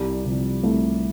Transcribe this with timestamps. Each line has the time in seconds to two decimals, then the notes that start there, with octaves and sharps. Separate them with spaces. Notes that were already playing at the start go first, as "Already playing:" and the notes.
Already playing: C2 G3
0.25 C3 F3
0.63 C2 A3